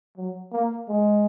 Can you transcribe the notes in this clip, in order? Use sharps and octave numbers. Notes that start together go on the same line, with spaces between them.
F#3
A#3
G#3